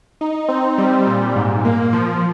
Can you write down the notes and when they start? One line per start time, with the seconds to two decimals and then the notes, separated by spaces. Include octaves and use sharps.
0.21 D#4
0.49 C4
0.78 G3
1.06 A#2
1.36 G#2
1.65 A#3
1.93 F3